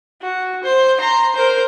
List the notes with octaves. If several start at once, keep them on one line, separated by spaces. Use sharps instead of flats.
F#4
C5
A#5 C6
A#4 C5